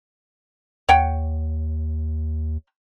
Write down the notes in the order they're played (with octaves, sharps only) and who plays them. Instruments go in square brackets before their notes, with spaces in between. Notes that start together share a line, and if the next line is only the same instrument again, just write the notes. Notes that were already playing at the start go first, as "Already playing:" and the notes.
[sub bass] D#2 [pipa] C#5 F#5 G5